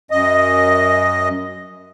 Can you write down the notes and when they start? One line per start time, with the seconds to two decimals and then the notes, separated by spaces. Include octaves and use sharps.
0.11 F#2 D#5